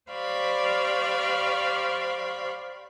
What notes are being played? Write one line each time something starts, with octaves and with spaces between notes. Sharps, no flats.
G4 C5 D5 F5 B5 C#6